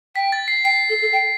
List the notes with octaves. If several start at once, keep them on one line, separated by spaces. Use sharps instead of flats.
G5 B6
A6
C7
G5 C7
A4
A4
G5